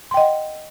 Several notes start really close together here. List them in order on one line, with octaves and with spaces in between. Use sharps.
C6 G5 D#5 F#5